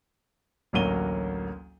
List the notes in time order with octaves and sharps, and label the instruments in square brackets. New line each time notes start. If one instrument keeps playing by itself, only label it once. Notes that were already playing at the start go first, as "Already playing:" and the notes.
[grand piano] A1 D2 F#3 A#3 D#7 G7